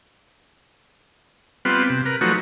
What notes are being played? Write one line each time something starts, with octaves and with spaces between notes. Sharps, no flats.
G3 B3 C4 F4 B4
C3
A#4 B4
F3 F#3 A3 D#4 F#4 B4